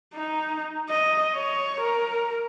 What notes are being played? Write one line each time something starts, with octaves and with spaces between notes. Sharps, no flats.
D#4
D#5
C#5
A#4